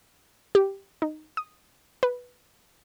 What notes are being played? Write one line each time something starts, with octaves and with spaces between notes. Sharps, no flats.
G4
D#4
D#6
B4